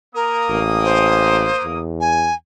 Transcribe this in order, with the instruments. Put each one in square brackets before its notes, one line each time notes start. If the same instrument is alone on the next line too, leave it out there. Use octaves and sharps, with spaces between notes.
[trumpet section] A#3 D#6 [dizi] A#4
[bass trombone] A1
[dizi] C5
[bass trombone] E2
[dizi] G#5